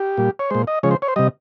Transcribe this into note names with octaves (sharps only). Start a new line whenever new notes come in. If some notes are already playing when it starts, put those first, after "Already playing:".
Already playing: G4
A#2 G3
C#5
A#2 G#3 C5
D#5
C#3 F3 G#3 C#5
C5
C#5
C5
C3 G3 D#5